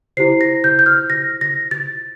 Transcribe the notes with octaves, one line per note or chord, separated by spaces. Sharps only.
E4 G4 C5 C7
A#6
G6
G6
F6
A#6
A#6
A6